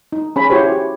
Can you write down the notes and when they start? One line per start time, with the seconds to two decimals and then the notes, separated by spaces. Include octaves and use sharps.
0.12 D#4
0.36 C#4 G#4 C5 B5
0.50 E4 F#4 G4 C5 C#5
0.72 G4